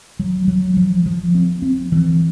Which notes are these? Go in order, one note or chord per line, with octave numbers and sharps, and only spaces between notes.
F#3
F#3
F3
F3
C4
C4
E3